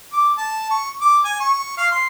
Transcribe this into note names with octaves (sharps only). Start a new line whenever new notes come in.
D6
A5
C#6
D6
G#5
C#6
F5
C6